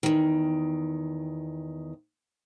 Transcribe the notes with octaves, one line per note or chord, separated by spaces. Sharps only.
E2 D#3